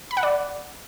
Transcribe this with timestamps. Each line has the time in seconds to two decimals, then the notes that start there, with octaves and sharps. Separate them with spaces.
0.11 B5
0.17 F#5
0.23 D5